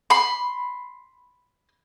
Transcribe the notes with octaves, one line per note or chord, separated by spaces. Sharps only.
B5 C6